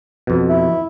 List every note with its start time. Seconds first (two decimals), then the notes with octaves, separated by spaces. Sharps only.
0.27 F2 B2
0.49 E4